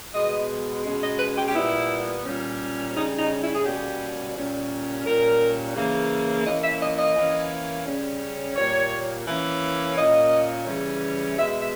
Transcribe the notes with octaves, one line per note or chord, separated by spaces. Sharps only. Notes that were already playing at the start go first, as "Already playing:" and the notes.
B2 G#3 B3 D#5
B2 G#3 C#4
D#5
B4
G4
G4
A#2 G3 B3 E4
A#2 G3 C#4
C#3 G3 C#4 D#4
D#4
E4
G#4
B2 G3 A#3 C#4 G4
A#2 G3 C#4
A#2 G3 C#4 A#4
C#3 E3 A#3
E3 A#3 C#4 D#5
E5
D#5
D#5
E3 A#3 C#4
C#3 G3 C#4
A#2 G3 A#3 C#5
E3 A#3 C#4
A#2 A#3 C#4 D#5
C#3 E3 G3 C#4
B2 G#3 B3 E5
E5